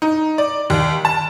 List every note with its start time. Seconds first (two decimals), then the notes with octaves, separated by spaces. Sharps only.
0.02 D#4
0.38 D5
0.70 D#2
1.05 A5